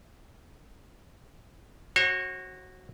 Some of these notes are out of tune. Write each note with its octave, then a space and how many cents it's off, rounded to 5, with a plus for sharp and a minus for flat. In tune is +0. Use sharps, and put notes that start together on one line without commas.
F#4 +0 C#5 -45